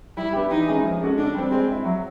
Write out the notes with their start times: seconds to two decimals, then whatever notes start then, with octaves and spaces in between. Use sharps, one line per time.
0.17 G3 E4
0.33 B3 D4 G4
0.50 E3 D#4
0.68 G#3 C#4 E4 G#4
0.83 F3
1.01 G#3 C#4 F#4 A4
1.18 D3 D4
1.35 G3 C4
1.51 G#3 C4
1.68 C4 E4
1.85 F#3